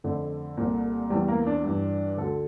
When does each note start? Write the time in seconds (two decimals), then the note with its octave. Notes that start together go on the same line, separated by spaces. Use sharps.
0.04 F2 D3 A3
0.57 C2 A#2
1.10 E2 E3 G3
1.28 A#3
1.47 D4
1.64 G2 E3
2.17 D2 D3 A4